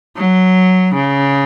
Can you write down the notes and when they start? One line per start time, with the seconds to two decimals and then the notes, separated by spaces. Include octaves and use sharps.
0.17 F#3
0.95 C#3